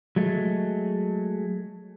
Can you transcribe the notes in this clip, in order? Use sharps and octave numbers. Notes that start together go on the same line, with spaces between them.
F#3 G#3 A3